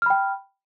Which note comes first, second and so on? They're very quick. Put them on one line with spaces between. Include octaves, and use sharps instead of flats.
F6 B5 G5